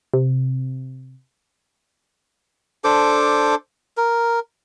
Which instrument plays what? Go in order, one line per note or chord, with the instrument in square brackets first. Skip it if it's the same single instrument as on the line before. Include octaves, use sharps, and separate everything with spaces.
[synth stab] C3
[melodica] D4 A4 C5 D6
A#4